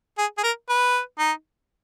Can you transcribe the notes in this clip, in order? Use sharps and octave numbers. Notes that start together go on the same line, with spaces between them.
G#4
G#4
A#4
B4
D#4